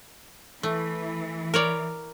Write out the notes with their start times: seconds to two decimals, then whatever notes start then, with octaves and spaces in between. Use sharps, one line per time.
0.63 E3 A3
1.54 A#4 C#5 D5